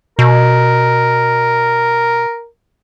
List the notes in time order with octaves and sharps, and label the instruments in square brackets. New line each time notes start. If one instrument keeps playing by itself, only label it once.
[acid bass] B2 [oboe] A#4